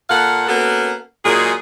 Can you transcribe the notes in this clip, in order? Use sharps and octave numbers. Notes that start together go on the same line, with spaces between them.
A#2 A4 F5 F#5
A#3 B3 C#4 F#4 A4 A#4
A#2 F#3 G#3 G#4